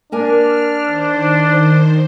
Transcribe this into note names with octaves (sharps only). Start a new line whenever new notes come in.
A#3 D4 A#4 G#5 F6
D#3 C5